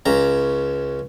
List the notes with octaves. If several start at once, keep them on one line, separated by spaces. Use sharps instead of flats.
C#2 C#3 A#5